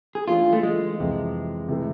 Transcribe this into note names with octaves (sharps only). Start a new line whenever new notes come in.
G#4
E3 A3 D4 F4
A3
G#3
F2 C3 E3
C3 E3 A3